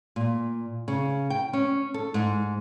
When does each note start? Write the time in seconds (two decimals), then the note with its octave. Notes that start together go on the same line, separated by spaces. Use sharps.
0.16 A#2
0.88 C#3
1.30 G5
1.53 C#4
1.94 A4
2.14 G#2